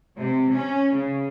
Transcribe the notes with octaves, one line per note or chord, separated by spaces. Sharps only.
C3
C#4
C#3